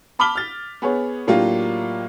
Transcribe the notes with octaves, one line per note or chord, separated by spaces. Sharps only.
A5 B5 D6 F6 B6 G7
F6 A6
B3 G#4 C#5
A2 F#3 A#3 D4 F4 G4